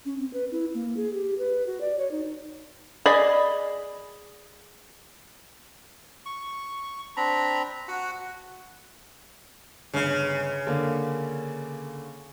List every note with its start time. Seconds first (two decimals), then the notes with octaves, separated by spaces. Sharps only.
0.05 C#4
0.18 C4
0.33 B4
0.51 E4
0.74 A#3
0.97 G#4
1.14 G4
1.38 B4
1.67 F#4
1.81 D5
1.98 C#5
2.11 D#4
3.06 G#4 D5 D#5 B5
6.26 C#6
7.17 C4 D4 A#5 B5
7.88 F#4 F#5
9.94 G1 C#3
10.67 D3 A#3